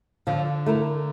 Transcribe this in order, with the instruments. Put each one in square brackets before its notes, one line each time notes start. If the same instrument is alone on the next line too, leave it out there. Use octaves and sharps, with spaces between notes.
[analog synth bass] D3 [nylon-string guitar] F3
[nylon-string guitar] A3 E4 A#4